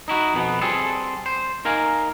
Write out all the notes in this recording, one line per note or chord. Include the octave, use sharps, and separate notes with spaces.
D#4 E4 F#4
F2 B2 B3
G3 C4 G#4 A4
C5
D#4 A#4 F5 G#5